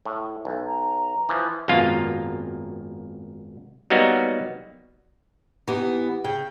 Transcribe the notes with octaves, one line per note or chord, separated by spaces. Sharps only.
A2
B1
A#5
E3 F3
G#1 F#2 B2 A#3 F4 F5
F#3 G3 A#3 B3 D#4 F#4
E3 B3 D#4 G4
C#3 G5